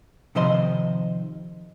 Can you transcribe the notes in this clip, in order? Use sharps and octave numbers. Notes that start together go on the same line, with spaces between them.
C3 D#3 F3 C5 D#5 C6